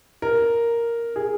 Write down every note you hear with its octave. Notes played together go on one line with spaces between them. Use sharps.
A#4
G#4